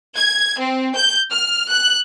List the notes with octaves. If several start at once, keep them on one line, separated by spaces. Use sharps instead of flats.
G#6
C4
G6
F6
F#6